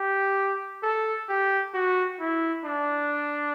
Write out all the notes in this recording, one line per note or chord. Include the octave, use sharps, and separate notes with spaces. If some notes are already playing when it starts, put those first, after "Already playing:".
Already playing: G4
A4
G4
F#4
E4
D4